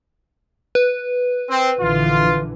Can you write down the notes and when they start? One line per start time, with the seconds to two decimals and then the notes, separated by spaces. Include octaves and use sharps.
0.75 B4
1.49 C4
1.80 A#1 D3 E3 F4